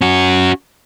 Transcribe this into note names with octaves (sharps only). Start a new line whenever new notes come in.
C#4 F#4